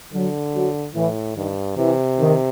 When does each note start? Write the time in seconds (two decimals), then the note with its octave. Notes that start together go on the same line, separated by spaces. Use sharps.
0.12 D3 F#3
0.54 F#3
0.95 A2 E3
1.36 G2 D#3
1.77 C3 E3
2.19 D#3